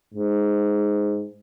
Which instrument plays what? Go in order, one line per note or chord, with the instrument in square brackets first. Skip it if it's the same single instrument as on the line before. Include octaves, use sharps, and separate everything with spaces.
[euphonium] G#2